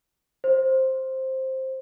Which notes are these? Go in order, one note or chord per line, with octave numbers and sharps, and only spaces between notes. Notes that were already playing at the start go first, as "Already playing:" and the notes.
C5